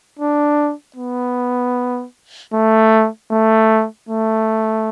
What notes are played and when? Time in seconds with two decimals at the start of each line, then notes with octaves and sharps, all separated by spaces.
0.19 D4
0.96 B3
2.53 A3
3.31 A3
4.09 A3